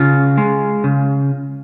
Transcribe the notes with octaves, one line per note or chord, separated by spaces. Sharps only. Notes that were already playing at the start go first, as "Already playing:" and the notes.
Already playing: C#3 F4
G#3
C#3